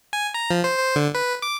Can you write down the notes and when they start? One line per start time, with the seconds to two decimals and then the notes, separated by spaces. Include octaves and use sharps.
0.13 G#5
0.34 A#5
0.51 F3
0.64 C5
0.78 C5
0.96 D3
1.15 B4
1.42 D6